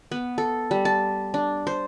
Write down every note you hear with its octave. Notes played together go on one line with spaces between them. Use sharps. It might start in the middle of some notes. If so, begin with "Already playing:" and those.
B3
A4
G3
A5
D4
C5